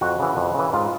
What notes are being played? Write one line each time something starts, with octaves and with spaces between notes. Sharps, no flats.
F2 F#4
C#3 E3
F2
C#3 E3
G#2 F4